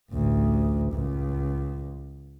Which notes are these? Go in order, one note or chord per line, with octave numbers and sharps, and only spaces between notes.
A1 D2
C#2